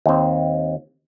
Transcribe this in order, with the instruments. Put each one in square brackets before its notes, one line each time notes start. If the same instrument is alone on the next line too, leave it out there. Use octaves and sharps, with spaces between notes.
[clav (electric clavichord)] D#2 C4